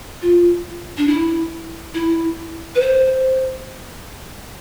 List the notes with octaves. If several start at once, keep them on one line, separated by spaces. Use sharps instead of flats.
F4
D4
E4
E4
B4
C5